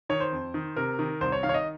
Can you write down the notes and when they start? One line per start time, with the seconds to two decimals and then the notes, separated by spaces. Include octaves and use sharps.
0.09 D#3 C#5
0.20 C5
0.32 F2
0.54 D#3
0.76 C3 A#4
0.99 D#3
1.21 C2 C5
1.32 C#5
1.43 D#3 F5
1.49 C#5
1.54 D#5